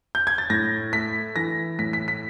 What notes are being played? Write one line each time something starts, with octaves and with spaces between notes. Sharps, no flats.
G6
G#6
A6
A2 A#6
A3 B6
E3 A#6
A2 B6
B6
B6